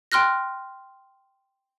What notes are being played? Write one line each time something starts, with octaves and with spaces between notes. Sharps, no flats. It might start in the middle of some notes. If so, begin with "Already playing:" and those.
G5 C6 F6 F#6 A#6